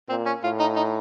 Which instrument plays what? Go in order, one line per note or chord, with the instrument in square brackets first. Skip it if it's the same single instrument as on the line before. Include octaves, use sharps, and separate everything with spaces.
[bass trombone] A#2 [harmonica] C4
[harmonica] C#4
[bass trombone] A2 [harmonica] F4
[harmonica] D#4
D#4